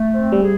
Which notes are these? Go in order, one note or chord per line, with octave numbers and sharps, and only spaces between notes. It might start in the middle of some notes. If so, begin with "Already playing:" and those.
Already playing: A3
C4
G3
G#4